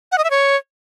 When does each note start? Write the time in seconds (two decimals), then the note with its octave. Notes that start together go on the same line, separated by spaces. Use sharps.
0.12 F#5
0.18 D#5
0.24 E5
0.30 C#5